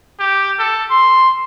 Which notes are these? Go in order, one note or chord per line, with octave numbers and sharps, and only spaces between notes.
G4
A4
C6